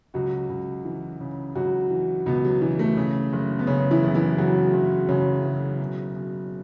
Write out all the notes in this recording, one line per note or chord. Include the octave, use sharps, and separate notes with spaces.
C#2 F#3 F#4
C#2
E3
C#3
C#2 F#3 F#4
E3
C#2 B2 B3
F#3
E3 F#3
A3
C#3
F#1
B3
C#3 C#4
E3 E4
F#1
E3 E4
C#3 F#3 F#4
F#1
F#2 C#3 C#4
F#1
B2
B2